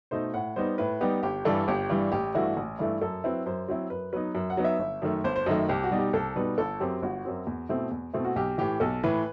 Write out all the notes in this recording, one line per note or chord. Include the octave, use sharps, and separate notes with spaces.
B2 A3 D#4 C5
A2 F#5
G3 B3 D#4 C5
A2 B4
G3 B3 D#4 G4
G1 G4
G2 E3 G3 A4
G1 G4
G2 E3 G3
A1 G4
G2 E3 A3 E4 F#4
A1
G2 E3 A3 E4
F#2 A4
F#3 C4 E4 B4
F#2 C5
F#3 C4 E4
F#2 B4
F#3 B3 D#4 B4
F#2
F#5
F#3 B3 D#4
E5
G1
F#2 D#3 A3
G1 C5
C5
F#2 D#3 A3 D#5
C2 G4
F#4
B2 G3 D#4
G4
C2 A4
B2 G3 D#4 B4
G1 A4
F#2 F#3 C4 G4
G1 F#4
F#2 F#3 C4
E2
B2 A3 C4 E4
E2
B2 A3 C4 E4
F#4
B1 G4
A2 E3 G4
B1 A4
A2 E3 B4